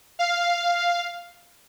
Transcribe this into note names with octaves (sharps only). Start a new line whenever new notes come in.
F5